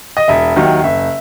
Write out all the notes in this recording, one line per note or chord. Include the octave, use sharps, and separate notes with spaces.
D#5
E1 E5
D#2 D#3 F#3
F#1 E5